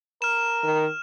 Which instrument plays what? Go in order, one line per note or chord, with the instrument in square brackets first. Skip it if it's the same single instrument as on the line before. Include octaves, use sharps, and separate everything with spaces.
[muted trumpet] A#4 [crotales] F6 E7
[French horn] D#3